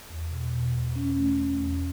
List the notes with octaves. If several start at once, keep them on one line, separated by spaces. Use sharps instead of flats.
E2
B2
B2
E2
C#4
A3
C#4
E2